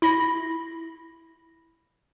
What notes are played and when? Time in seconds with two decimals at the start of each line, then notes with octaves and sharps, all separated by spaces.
0.02 E4 B5 A#6